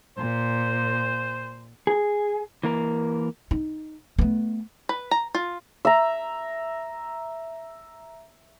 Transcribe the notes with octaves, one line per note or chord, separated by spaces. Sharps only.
A#2 C5
G#4
E3 A#3 A#4
D#4
A3 B3
B4
A#5
F4
E5 A#5